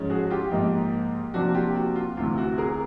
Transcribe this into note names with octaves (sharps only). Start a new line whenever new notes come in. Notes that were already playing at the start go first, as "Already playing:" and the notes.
Already playing: G#2 F3 G#3 C#4
F#4 G#4
F4 G4
G#2 F3 A#3 D#4
C3 F3 A#3 D4 F#4
F4 G4
F#4
F4
D2 C3 E3 F4
F#4
G#4 A#4